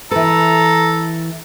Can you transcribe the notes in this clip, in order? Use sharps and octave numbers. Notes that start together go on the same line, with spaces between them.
E3 A4 B4 A#5